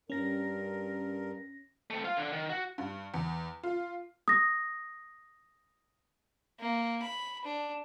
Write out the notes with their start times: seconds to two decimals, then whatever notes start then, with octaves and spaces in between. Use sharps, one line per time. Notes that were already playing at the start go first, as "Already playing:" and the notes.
0.10 G2 C#4 A#4 A#6
1.90 A3 C4
2.04 F4 F5
2.17 D3 D4
2.32 D#3
2.49 F#4
2.78 G2
3.14 E2
3.63 F4
4.28 D#6 A#6
6.60 A#3
7.03 B5
7.45 D4